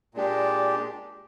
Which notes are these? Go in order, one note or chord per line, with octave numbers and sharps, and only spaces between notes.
A#2 G#3 D4 G4